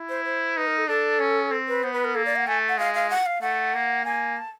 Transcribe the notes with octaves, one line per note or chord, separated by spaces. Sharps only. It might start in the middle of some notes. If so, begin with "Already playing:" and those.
Already playing: E4
C5
C5
D#4 B4
A#4
A4
D4 A4
C#4
C4
B4
B3 C5
B4
A#4
A#3 A4
D5
F#5
A3 G#5
F#5
G#3 F5
F5
F#5
F5
A3 F#5
A#3
A#3 G#5
A5